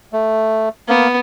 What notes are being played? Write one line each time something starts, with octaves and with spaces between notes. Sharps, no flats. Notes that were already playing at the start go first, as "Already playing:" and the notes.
A3
A#3 B3